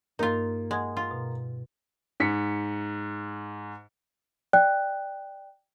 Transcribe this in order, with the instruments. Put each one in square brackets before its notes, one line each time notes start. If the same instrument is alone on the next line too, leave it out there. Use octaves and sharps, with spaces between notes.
[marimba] G2 [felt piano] A#3 [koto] D#4 F4
[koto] G#3 [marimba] F#5 D#6 G#6
[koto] F4
[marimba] B2
[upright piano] G#2 B6 C#7
[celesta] D5 G5 F#6